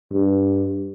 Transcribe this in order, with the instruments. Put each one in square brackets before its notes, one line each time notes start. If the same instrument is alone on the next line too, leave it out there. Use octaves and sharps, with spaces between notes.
[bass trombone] G2